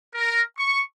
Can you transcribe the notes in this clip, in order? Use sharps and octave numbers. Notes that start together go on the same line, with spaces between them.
A#4
C#6